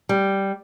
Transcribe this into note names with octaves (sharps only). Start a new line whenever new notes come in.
G3